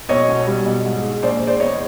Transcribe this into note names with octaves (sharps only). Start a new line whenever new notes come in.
B1 C#5 D#5
B2
G3
B1
G#2
G#3
A#1 C5 D5
G#3
C5 D5
E2 C#5 D#5